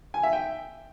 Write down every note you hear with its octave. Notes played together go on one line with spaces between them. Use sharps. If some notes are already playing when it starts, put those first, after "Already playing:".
G#5
E5
G5